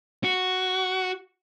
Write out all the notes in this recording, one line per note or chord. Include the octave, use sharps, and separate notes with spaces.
F#4